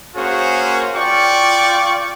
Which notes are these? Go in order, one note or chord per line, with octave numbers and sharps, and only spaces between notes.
A#3 C#4 F#4 G#4 C5
F4 D5 G5 C#6